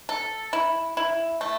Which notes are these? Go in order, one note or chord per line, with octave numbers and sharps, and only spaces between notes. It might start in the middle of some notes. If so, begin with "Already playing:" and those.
A4
E4
E4
A3